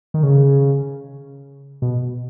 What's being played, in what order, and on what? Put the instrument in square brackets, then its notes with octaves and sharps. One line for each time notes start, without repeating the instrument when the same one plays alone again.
[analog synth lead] D#3
C#3
B2